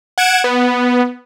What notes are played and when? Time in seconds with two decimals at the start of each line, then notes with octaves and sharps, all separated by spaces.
0.18 F#5 G#6 D7 E7
0.44 B3